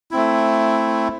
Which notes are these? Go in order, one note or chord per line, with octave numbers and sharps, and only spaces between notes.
A3 C4 E4